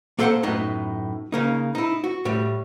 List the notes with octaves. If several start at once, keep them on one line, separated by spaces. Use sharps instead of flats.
A#3 A4 C5 E5 F#5 A5
F#2 A2 B3 D#4
C#3 A#3 D#4
D#4 E4
F#4
A2 G3